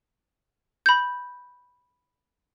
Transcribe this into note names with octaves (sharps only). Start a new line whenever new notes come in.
B5 G6